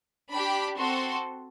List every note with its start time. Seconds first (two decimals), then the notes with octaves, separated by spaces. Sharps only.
0.30 D4 G4 B5
0.78 C4 F#4 A4 C6